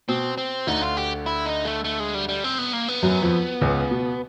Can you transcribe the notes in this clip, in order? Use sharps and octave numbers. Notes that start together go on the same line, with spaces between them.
B2 C4
C4
D2 D3 D#4
F4
G4
E4
D#4
A3
A3
G#3
G3
G3
C4
B3
A#3
B3
F#2 F#3
F2 F3
C#2 C#3
B2